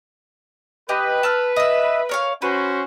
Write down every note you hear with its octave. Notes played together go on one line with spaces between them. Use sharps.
G4 B4 D#5
A5 E6 F6
D#5 E5
A#4 C#5 F5
C#4 F#4 B4 C5